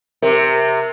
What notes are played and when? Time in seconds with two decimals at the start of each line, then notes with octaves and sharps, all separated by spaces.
0.22 C3 A#4